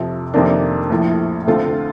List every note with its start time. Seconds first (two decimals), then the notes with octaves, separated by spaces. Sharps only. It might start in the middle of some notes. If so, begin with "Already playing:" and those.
Already playing: F2 C3 F3
0.34 F2 C3 D#3 A#3 D4
0.90 A#1 A2 F3
1.47 D2 D3 A3 C4 F4